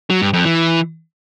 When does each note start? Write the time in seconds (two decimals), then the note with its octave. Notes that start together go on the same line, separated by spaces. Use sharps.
0.10 F#3
0.22 G2
0.33 F2
0.45 E3